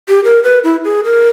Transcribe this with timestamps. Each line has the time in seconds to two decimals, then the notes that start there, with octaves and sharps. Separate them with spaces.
0.09 G4
0.24 A#4
0.43 B4
0.64 E4
0.84 G#4
1.04 A#4